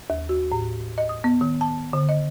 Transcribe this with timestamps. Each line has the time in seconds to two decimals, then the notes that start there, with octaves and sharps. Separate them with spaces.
0.10 D#2
0.29 F#4
0.52 A2
0.98 D#5
1.09 D#6
1.24 B3
1.41 D#3
1.61 A5
1.93 D3
2.09 D#5